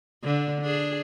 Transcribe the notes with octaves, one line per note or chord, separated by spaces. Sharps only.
D3 D4
D4 G#4